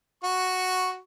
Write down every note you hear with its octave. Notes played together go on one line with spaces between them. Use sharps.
F#4 C#6